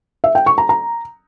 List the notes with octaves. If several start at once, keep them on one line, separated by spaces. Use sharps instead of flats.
E5
G5
C#6
A#5
A#5